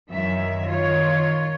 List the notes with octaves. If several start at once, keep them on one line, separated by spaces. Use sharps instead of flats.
F#2 D#3 E3 F#3 E5
D#3 F4 C#5